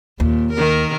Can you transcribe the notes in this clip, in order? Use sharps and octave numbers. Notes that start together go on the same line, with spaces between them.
D#2 A#2
D#3 A#4